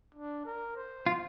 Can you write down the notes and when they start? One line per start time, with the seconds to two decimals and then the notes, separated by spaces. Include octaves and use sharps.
0.15 D4
0.45 A#4
0.76 C5
1.06 F4